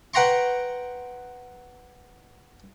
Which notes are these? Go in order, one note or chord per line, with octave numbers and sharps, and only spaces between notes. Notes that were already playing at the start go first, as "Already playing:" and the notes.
B4 F#5 G5 A#5 C6 C#6